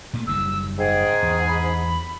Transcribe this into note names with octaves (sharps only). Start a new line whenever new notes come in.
A#2 G3 A3
F#1 D#3 G3 E6
G#2 G#4 G5
E2
B5